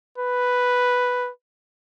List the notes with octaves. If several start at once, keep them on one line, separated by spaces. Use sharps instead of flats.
B4